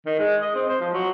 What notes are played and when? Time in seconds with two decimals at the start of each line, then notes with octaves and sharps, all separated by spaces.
0.06 D#3
0.19 G#3
0.42 D#5
0.55 C4
0.69 C5
0.81 F3
0.94 F#3